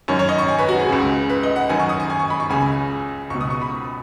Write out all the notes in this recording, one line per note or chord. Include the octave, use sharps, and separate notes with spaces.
F#2 D#3 C#5
C#5
D#5
C#6
G#5
B4
F#4
G#4
C#2 C#3
B4
D#5
F#5
F#2 D#3 G#5
C#6
D#6
C#6
G#5
C#6
B5
C#6
C#2 C#3 G#5
C#2 B2 C#6
D#6
C#6
B5